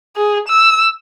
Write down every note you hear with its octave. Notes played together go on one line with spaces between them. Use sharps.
G#4
E6